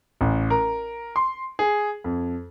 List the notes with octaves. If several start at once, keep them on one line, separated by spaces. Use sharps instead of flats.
A1
A#4
C6
G#4
F2